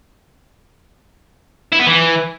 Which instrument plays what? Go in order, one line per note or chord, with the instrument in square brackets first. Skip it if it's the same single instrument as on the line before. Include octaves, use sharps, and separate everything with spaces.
[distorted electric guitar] E4
B3
E3